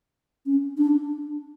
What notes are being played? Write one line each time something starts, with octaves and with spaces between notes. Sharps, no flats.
C#4
D4